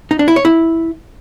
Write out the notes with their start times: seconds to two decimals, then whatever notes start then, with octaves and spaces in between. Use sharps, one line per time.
0.11 D#4
0.19 D4
0.28 E4
0.36 C#5
0.45 E4